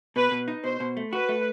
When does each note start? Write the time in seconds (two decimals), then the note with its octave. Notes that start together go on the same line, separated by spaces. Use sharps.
0.15 B2 B4
0.31 B2
0.48 D#4
0.64 B2 C5
0.80 B2
0.97 A3
1.13 F#4 B4
1.29 A3